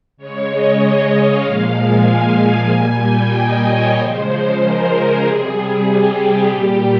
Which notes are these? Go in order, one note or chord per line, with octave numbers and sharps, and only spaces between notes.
C#3 G#3 C#5
D#5
F5
A#2 F3 G#3
G#5
G#5
A#2 G3 G#5
G5
D#5
C#5
C#3 F3 G#3 C5
A#4
G#4
C3 G3
G#4
G4
A#2 G3 G4